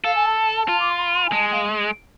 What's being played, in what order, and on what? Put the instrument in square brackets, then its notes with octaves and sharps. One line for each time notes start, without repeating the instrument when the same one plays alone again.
[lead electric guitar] A4 [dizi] F5
[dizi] G#5
A5
[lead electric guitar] F4
[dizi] D6
C6
B5
C6
B5
G#5
[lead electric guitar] G#3 [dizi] A5
[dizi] G#5
F5